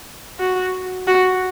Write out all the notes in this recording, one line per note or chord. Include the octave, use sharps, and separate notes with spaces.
F#4
F#4